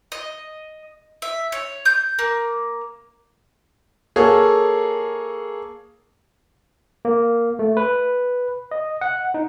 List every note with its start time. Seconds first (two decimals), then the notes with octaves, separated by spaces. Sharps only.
0.12 D#5
1.22 E5
1.52 C#5
1.85 G6
2.19 A#3
4.16 A#3 G#4 A4 C#5 F5
7.05 A#3
7.59 A3
7.77 B4
8.71 D#5
9.01 F#5
9.34 D#4